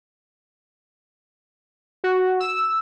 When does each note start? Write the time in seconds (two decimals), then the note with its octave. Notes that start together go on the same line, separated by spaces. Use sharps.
2.04 F#4
2.40 E6